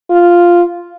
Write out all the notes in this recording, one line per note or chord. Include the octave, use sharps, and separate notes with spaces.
F4